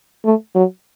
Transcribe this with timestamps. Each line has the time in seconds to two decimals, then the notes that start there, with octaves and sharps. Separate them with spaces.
0.25 A3
0.55 F#3